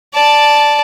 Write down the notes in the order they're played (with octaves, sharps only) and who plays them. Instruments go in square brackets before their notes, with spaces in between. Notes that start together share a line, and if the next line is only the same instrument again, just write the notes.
[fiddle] D5 A5